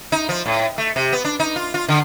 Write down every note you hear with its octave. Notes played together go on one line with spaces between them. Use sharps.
D#4
F3
A2
A3
C3
B3
D4
D#4
F4
F4
D3